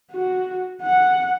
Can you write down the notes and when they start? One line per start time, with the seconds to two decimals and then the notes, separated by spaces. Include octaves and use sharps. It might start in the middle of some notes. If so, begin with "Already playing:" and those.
0.12 F#4
0.82 F#5